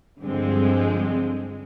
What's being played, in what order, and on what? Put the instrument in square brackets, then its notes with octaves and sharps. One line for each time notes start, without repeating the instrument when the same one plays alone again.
[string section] G2 D3 F3 G#3 C4